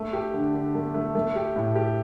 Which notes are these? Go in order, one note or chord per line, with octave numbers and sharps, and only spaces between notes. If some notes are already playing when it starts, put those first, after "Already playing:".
Already playing: A3
G4
D3
D3
A3
A3
A3
G4
A2
G4